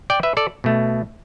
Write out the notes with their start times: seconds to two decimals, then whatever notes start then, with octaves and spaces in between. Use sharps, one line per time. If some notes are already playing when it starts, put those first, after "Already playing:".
0.10 D5 G5
0.23 B4 E5
0.37 A4 D5
0.64 B2 A3